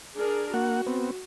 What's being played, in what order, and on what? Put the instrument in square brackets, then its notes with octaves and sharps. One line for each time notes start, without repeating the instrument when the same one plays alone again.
[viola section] D4 G#4 A#4
[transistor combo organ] A#3 F#5 [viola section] F#4
[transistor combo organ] B3 C4